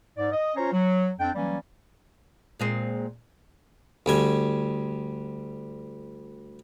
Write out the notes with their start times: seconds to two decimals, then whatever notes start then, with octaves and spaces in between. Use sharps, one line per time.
0.17 G#2 D5
0.31 D#5
0.55 C#4 F4 C5 C#5 A#5
0.72 F#3
1.19 F2 C4 D4 G5
1.35 E3 F#3 G3 A#3 C#4
2.60 A#2 G#3 C4
4.06 D2 G3 G#5